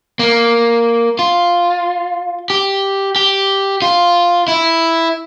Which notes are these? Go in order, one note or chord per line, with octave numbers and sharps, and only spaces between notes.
A#3
F4
G4
G4
F4
E4